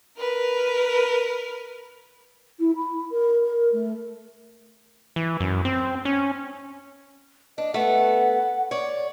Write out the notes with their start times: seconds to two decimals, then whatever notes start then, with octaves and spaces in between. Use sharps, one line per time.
0.17 A#4 B4
2.59 E4
2.76 B5
3.10 A#4
3.43 A#4
3.72 A3
5.16 E3
5.40 F#2
5.65 C4
6.05 C#4
7.58 D4 D#5
7.74 A3 B3 F#5
8.71 C#5 D5